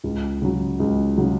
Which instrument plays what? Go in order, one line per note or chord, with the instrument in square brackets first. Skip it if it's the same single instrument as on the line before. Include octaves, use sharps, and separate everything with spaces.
[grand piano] C#2
C#3 F#3
C#2
C#3 F#3